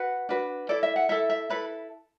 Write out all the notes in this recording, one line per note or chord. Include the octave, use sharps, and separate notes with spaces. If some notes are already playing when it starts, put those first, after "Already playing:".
Already playing: F#4 B4 F#5
D4 F#4 B4
E4 A4 D5
E5
F#5
E4 A4 E5
E5
E4 A4 B4